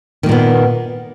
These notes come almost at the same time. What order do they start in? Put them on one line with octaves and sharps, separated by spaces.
D#3 A#3 A#2 B3